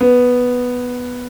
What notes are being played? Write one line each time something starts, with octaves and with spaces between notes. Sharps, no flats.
B3